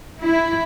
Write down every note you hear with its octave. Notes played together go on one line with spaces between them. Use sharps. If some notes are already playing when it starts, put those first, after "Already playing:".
E4